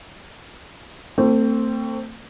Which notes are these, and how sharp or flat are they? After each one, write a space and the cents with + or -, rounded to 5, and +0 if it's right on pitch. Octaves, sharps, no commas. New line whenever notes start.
A3 +35 C4 +0